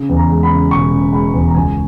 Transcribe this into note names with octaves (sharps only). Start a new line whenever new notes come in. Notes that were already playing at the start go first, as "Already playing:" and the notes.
Already playing: C#3
E2
A#5
G#3
B5
C#3
E1 C#6
C#3
G#3 B5
E2
A#5
C#2 G#5